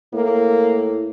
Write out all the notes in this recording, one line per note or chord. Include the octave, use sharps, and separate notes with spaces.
A2 A#3